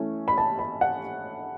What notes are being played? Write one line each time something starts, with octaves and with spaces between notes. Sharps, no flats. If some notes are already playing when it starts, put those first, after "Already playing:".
Already playing: E3 A3 C#4
B5
A5
B5
F#5